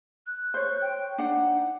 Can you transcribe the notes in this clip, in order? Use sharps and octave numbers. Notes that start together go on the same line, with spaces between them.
F#6
C5 C#5
G5
D4 D#4 F#5